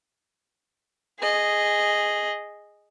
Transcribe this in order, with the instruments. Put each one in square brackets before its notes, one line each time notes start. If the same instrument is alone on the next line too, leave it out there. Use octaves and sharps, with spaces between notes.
[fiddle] G#4 D#5